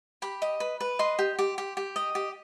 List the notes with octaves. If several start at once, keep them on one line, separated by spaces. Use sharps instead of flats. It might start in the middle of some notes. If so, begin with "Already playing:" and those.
G4 B5
D#5
B4
B4
D#5 C6
G4
G4
G4
G4
D#5
G4